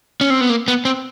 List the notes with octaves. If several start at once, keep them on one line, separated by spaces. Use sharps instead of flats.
C#4
C4
B3
A#3
B3
C4